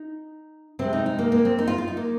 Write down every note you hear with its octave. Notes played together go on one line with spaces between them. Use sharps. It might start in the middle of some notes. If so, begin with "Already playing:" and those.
Already playing: D#4
C3 G#3 C4
D#4
D#4
A#3
A#3
C4
D#4
F4
F4
D#4
A#3